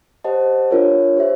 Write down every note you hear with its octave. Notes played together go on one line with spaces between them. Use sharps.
G4 C5 D#5 F#5 A5
D4 F4 A#4 C#5
G4 C5 E5